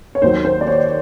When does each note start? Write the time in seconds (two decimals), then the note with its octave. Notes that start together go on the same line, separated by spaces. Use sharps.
0.15 C#5
0.22 D#2 D#3 F#3 C5
0.45 C5
0.61 D5
0.67 C#5